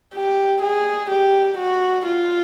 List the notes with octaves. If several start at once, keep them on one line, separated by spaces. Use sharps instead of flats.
G4
G#4
G4
F#4
F4